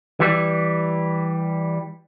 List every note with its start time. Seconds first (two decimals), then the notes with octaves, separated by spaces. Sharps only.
0.20 E3 G3